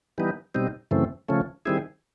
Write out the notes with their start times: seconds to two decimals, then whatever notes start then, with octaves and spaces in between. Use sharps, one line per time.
0.18 E3 G3 B3 D#4
0.55 B2 G3 C4 D#4
0.91 F#2 C#3 E3 A3 C4
1.28 C#3 F3 A3 C#4
1.66 D#3 G3 C4 E4 G#4